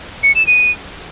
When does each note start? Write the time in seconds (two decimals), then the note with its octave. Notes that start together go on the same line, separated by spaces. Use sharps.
0.23 C#7
0.35 E7
0.47 D#7